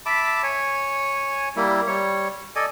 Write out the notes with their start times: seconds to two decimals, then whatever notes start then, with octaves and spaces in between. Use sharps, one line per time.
0.06 E5 A5 B5 D6
0.43 C#5 G#5
1.56 G3 A#3 E4
1.87 G3 C#5
2.56 A4 D5 D#5 G#5